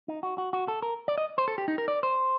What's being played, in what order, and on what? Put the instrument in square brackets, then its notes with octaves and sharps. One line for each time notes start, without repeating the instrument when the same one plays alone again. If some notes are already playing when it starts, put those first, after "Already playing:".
[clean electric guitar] D#4
F#4
F#4
F#4
A4
A#4
D5
D#5
C5
A4
G4
D#4
A#4
D5
C5